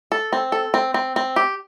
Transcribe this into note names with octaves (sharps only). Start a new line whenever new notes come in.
A4
C4
A4
C4
C4
C4
G4